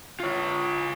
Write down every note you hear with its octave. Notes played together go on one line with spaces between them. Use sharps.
F4 C#5